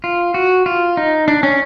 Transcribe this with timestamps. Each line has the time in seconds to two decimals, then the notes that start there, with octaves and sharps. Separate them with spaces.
0.04 F4
0.34 F#4
0.66 F4
0.97 D#4
1.28 D4
1.43 C#4